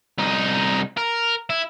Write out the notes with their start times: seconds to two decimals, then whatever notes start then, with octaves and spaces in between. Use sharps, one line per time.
0.19 C2 D#4
0.97 A#4
1.50 E4